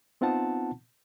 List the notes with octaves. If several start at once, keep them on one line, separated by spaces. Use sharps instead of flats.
B3 C4 D#4 F4 F#5 A5